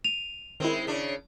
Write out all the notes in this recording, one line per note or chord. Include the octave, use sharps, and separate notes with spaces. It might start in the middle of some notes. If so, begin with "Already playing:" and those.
D#7 F7
D#3 G#3 C4 E4
C#3 D4